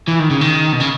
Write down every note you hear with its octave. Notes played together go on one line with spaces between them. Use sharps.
E3
D#3
C#3
D#3
B2
C#3